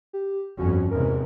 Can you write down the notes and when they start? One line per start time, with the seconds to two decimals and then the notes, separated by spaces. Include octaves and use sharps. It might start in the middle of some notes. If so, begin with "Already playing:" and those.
0.13 G4
0.59 G1 F2 C#4 F#4
0.91 E2 G#2 C3 A#4